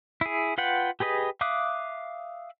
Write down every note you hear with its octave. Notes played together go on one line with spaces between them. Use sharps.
E4 G#4
F4 B4 F#5 G5
G4 G#4 B4 D#5
E5 F5 D6 D#6 F#6